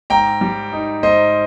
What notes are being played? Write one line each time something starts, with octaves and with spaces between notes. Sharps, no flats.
G#2 G5 A#5
G3
D#4
G#2 C5 D#5